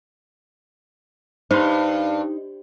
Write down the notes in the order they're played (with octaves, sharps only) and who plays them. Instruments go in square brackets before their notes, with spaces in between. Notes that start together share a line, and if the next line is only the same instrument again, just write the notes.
[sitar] G2 [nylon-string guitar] D#4 [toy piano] C5 C6